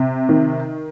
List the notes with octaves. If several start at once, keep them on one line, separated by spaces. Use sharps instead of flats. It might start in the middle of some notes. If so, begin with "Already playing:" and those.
Already playing: C3
D#3